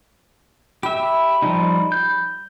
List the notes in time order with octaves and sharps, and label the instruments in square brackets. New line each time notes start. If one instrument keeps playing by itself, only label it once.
[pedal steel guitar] G4 E5 [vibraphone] B5
[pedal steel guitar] F3 G3 D#4
G6